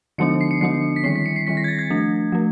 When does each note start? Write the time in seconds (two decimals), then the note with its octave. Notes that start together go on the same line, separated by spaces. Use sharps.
0.18 D3 F3 G#3 B3 D4 C#7
0.41 C7
0.51 C#7
0.61 D3 F3 G#3 B3 D4 C7
0.96 B6
1.04 D#3 G3 C4 C7
1.16 B6
1.26 C#7
1.36 C7
1.47 D#3 G3 C4 B6
1.57 A#6
1.64 G#6
1.68 A6
1.79 G#6
1.90 F3 A3 D4
2.32 F3 A3